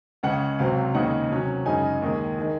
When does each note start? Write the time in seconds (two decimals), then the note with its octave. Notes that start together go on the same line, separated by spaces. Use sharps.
0.23 C#2 C#3 G#3 F#5
0.59 C#2 C3 F#3 C4 F5
0.94 D#2 C#3 G#3 D#4 F#5
1.30 C3 F#3 C#4
1.66 F#2 C#3 G#3 D#4 G#5
2.02 D#2 D#3 G#3
2.39 D#3 G#3